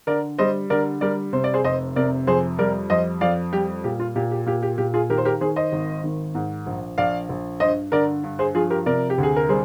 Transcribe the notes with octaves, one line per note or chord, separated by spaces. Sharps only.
D3 A#4 D5
G3 C5 D#5
D3 A#4 D5
G3 A#4 D5
C3 C5
D5
G#4 C5
F1 C5 D#5
C3 A#4 D5
F2 G#4 C5
G3 A#4 D5
F2 C5 D#5
F2 D5 F5
G3 G4
A#2 G4
F4
A#2 G4
G4
A#2 G4
G4
A#2 G4
F4 G#4
D#3 G4 A#4
C5
G4 A#4
D#3 G#4 C5
C5 D#5
G#1
D#3
G#2
A#1
A#1 D5 F5
A#1
G2 C5 D#5
D3 A#4 D5
G2
G#4 C5
F3 F4 G#4
G4 A#4
C3 A#4 D5
G4
D2
G#4
A#4
G3 G#4 C5